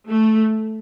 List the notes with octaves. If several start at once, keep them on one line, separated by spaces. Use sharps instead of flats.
A3